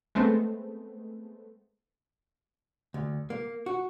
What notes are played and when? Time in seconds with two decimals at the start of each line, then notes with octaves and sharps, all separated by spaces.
0.15 G#3 A3 B3 C4
2.94 D2
3.30 A#3
3.66 F#4